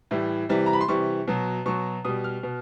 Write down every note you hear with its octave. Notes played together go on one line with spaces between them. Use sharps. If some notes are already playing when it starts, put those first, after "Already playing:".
A2 E3 G3
C3 E3 G3
A#5
B5
C6
C3 E3 G3 C#6
B2 F#3
B2 F#3 C#6
B2 G3 D#6
F6
B2